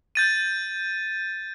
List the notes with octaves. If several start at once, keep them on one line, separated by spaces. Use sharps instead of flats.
G6 A6 D#7